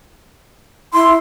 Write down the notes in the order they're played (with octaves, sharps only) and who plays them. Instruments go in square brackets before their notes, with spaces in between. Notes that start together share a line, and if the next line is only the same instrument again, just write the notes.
[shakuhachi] E4 [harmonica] C6